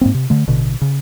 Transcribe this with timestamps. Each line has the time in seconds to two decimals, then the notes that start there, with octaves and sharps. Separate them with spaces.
0.01 G#2 A#3 C4
0.14 C3
0.30 D3 A3
0.48 A1 B2 D3
0.81 C#3